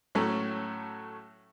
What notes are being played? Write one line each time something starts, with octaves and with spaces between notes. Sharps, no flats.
A2 F#3 A3 C#4